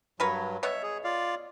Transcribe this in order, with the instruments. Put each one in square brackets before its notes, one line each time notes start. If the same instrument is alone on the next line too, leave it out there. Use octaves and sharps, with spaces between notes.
[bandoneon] G2 F#3 [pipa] A#4 B4 C#5
[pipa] B2 B3 C#5 [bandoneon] E5
[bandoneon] G#4
F4 D5 F5